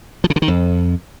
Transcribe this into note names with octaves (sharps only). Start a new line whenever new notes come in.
F3
C#3
D3
D#3
F2